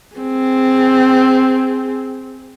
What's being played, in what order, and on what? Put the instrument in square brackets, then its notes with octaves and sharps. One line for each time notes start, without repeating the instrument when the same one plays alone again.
[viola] C4 G#4